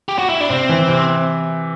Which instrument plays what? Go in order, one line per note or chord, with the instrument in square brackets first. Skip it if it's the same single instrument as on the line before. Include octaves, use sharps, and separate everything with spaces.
[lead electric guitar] G4
F#4
E4
D4
[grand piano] C3 [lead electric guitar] C4
[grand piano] E3
C3